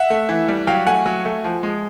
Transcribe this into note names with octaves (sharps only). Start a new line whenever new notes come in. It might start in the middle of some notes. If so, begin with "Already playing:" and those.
Already playing: E5 F#5
A3
E3
G3
F#3 F5 G5
A3 F#5 G#5
F#3
A3
F3
G#3